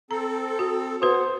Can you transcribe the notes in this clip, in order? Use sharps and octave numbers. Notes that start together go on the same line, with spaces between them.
C4 A4 A#5
F#4
B3 F#4 B4 C5